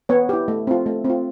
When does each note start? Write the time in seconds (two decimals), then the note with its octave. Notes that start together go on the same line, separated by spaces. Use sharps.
0.09 B3 C#5
0.29 E4 G4
0.48 A3
0.67 C4 F4
0.86 A3
1.05 C4
1.10 F4